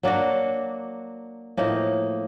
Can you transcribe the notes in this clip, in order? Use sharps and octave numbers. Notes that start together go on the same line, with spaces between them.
F#3 A#3 D4 F#4
A2 F3 A#3 D#4